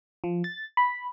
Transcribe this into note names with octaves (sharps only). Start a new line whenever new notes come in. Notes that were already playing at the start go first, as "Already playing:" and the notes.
F3
A6
B5